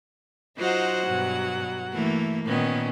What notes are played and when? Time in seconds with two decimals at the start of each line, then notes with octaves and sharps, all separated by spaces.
0.57 F#3 D#4 F4 C5 F#5
1.08 G2 B2
1.93 E3 A3 A#3
2.45 A#2 D#3 B3 C#4